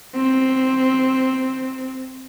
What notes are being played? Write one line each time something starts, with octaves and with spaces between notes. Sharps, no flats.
C4